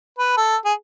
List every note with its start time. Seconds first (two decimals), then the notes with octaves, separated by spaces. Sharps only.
0.18 B4
0.37 A4
0.65 G#4